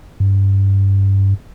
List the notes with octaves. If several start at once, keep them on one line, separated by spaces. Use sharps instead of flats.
G2